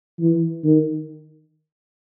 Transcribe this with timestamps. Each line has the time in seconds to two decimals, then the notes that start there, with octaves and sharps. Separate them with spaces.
0.20 E3
0.64 D#3